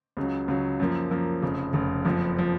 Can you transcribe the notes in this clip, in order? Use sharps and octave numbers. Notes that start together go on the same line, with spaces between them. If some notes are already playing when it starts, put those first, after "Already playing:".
C#2 C#3 F#3
C#2 C#3 F#3
F#2 F3 A#3
F#2 F3 A#3
F1 F2 C#3
F1 F2 C#3
F#1 F2 F3
F3